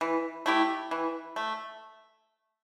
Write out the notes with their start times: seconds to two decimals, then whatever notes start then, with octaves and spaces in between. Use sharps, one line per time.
0.01 E3
0.46 A3 E4 G4
0.91 E3
1.36 A3